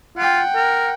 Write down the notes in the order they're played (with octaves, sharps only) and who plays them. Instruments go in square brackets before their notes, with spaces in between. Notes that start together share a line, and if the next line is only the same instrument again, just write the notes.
[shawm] F4 [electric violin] F#5 G5
[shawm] A#4